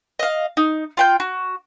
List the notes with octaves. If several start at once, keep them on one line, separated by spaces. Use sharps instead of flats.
D#5 F5
D#4
F4 G5 G6
F#4